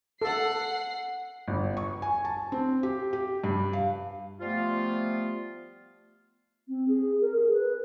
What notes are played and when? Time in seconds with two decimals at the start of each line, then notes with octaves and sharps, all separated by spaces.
0.22 A4 F#5 C7
1.48 G1
1.77 C#6
2.02 G#5
2.25 A5
2.52 C4
2.83 G4
3.13 G4
3.44 G2
3.73 F5
4.41 F3 G3 A3 B3 F4
6.68 C4
6.88 G#4
7.21 A#4
7.36 G#4
7.52 B4